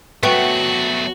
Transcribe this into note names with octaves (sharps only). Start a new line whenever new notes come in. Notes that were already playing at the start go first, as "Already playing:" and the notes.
F#3 A3 B3 F#4 E5 G5 C#6